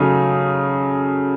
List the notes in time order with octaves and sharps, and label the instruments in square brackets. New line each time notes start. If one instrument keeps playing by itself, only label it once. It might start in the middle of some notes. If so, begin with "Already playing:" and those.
Already playing: [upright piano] C#3 F#3 A3 D#4